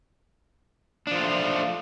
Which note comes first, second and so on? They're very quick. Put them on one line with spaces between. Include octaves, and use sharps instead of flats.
D4 F3 F4 A3